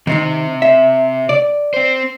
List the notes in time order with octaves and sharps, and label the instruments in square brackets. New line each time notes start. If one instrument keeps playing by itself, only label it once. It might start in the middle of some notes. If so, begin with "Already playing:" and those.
[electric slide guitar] C3 [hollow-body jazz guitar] D#3 C4 D#4
[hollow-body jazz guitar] E5
D5
[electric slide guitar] C4 C5